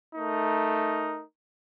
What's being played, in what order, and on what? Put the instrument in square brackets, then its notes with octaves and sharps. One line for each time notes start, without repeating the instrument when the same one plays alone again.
[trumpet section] A3 D#4 A#4